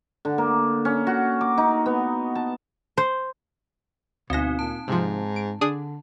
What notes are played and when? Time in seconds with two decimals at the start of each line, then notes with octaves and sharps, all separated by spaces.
0.25 D3
0.38 A#3
0.85 C#4
1.07 F#4
1.41 D6
1.58 D#4
1.86 B3
2.35 A5
2.97 C5
4.30 D2 B2 C4 D#4 A#6
4.59 A#2 A5
4.88 G#2 C3 F3
5.36 D7
5.61 D3 D4 G#4 D#6